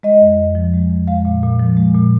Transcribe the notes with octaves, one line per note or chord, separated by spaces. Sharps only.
G#3 D#5
F2
F2
F3
G#3
F2
G#3 F5
A#2
A#2
F3
G#3
A#2